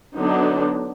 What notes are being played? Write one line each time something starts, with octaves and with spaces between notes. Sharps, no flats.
D3 F#3 B3 D4 D#4